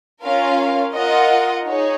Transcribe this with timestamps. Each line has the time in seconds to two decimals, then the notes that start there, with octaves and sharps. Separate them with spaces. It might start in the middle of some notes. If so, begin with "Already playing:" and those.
0.23 C#4 F4 A#4 F5
0.94 F4 A#4 D#5 F#5
1.66 D#4 G#4 C#5